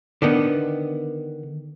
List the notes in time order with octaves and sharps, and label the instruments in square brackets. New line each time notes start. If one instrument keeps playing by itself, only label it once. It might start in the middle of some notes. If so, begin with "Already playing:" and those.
[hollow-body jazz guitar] D3 D#3 B3